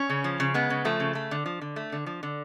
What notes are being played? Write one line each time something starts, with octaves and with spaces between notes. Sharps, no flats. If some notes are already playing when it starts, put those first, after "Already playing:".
Already playing: C#4
C#3
F3
C#3
G#3 B3
C#3
F3 A3
C#3
A3
D3
F3
D3
A3
D3
F3
D3